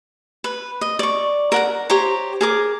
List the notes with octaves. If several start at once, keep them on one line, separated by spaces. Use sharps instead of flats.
B4
D#5
D5 C#6
A#4 F#5 A#5
G4 C5 C#5 A#5
G#4 A#4 D6